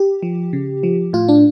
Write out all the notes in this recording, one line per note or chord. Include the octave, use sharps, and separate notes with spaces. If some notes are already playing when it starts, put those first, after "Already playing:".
Already playing: G4
F3
C#3
F3
A2 F4
D4